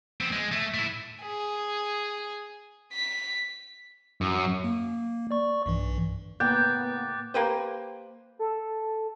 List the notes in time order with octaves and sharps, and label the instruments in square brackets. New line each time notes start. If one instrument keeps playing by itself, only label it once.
[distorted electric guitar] B3 C4
G#3
A3
A3 E4
[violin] G#4
B6
[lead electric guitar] F#2
[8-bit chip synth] A#3
D5 C#6
B1 G2 E3
[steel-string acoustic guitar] A2 C#3 A#3 [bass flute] B3 [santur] G5 [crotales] D6 F#6 A6
[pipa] A#3 G4 B4 C5
[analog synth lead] A4